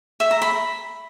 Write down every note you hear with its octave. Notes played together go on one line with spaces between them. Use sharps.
E5
A#5
B5